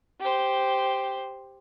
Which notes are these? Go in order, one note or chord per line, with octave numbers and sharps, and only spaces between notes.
G4 C5